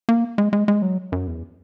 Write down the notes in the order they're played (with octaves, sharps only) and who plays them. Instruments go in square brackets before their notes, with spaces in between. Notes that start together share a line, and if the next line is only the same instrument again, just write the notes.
[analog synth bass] A#3
G#3
G#3
G#3
F#3
F#2
E2